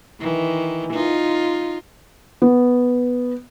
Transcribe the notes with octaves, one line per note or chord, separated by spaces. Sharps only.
D#3 E3
D#4 F4
B3